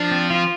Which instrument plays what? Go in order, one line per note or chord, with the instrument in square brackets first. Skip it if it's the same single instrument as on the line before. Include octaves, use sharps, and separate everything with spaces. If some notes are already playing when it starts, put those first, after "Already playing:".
Already playing: [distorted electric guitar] F3 [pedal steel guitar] D4
[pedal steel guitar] C4
F4